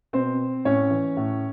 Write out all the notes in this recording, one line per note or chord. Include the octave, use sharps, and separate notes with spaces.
B2 C4 C5
A2 C#4 C#5
E3
A2